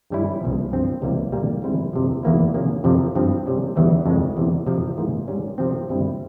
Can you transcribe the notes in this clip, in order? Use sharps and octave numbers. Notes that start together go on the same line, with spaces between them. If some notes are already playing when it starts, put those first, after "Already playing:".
G2 G3 C#4 E4
C2 A#2 F3
G2 F3 C4
C#2 C3 E3 G3 A#3
A#2 G3 A#3
G#2 G3 C4 E4
F2 C3 F3
E2 E3 A#3 E4
C3 F3 A#3 C#4
F2 C3 F3
G2 F3 C4
C3 G3 C#4
E2 C#3 E3 G3
F2 C#3 E3 G#3
E2 C3 E3
F2 C3 F3
G#2 E3 A#3
G#2 G3 C#4
C3 F3 C4
G2 G3 C4 E4